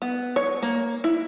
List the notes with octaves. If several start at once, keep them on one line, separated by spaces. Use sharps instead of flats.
B3
C#5
A#3
E4